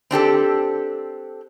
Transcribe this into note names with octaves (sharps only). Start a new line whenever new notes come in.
C4 D4 G4 A4